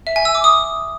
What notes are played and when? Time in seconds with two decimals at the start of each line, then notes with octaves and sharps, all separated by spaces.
0.07 E5
0.16 G#5
0.25 E6
0.35 D6
0.44 D#6